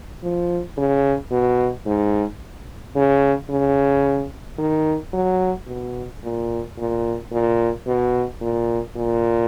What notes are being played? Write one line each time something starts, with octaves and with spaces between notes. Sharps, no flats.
F3
C#3
B2
G#2
C#3
C#3
D#3
F#3
B2
A#2
A#2
A#2
B2
A#2
A#2